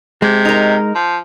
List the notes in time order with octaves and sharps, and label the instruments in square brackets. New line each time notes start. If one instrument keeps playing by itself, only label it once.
[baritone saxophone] C3 [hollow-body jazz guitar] G#3
[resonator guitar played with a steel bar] D#4 A#4
[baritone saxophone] F3